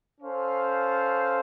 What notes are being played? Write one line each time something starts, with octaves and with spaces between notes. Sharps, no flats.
C#4 A4 C5 F5